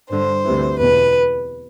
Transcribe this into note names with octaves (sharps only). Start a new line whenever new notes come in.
G2 D3 C5
D2 C3 E3
E2 B2 B4